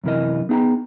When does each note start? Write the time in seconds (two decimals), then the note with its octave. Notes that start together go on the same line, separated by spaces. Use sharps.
0.04 F#2 C3 E3 A#4 D#5
0.49 B3 D#4 G#4 F#5 G5 A#5